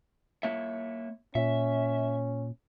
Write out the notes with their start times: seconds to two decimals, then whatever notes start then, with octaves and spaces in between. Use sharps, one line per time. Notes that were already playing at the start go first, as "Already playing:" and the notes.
0.43 A#3 C#5 E5
1.35 A#2 C#4 E5